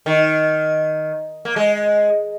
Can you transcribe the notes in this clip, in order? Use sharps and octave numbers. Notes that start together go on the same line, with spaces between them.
D#3
A#3
G#3